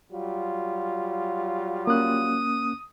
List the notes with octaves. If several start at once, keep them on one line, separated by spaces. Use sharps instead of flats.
F#3 G3 F4
A#3 C#4 D#6 F#6